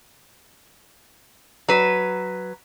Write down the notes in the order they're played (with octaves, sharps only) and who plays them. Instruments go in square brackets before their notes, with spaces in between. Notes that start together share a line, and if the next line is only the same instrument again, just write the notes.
[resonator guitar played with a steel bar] F#3 B4